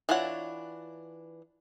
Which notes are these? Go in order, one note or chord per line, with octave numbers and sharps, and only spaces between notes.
E3 D4 F4 C#5 F#5